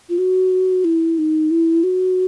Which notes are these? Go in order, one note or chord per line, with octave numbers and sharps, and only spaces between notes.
F4
F#4
E4
D#4
E4
F#4